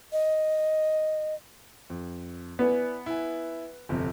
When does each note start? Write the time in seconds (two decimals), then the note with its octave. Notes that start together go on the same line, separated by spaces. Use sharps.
0.13 D#5
1.90 F2
2.59 B3 E4 D5 G#5
3.06 E4 G#5
3.89 G1 F2 C3